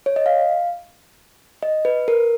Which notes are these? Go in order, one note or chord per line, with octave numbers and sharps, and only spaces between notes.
C#5
D#5
F5
D#5
B4
A#4